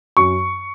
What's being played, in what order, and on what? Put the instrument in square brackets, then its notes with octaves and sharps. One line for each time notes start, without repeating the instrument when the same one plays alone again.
[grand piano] F#2 C#6